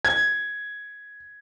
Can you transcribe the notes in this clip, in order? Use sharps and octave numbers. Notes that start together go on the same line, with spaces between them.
G#6